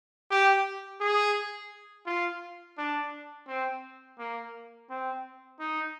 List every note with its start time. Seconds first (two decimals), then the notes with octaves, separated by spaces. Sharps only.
0.31 G4
1.00 G#4
2.06 F4
2.78 D4
3.47 C4
4.19 A#3
4.90 C4
5.59 D#4